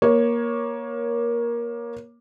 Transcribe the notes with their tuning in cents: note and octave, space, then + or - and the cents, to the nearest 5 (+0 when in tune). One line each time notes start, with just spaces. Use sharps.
A#3 +20 C#5 +0